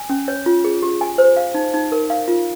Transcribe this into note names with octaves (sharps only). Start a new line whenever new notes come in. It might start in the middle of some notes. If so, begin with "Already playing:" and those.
Already playing: G#5
C#4
C#5
F4
G#4
G4
G#5
C5
F5
D#4
D#4
A#4
F5
F4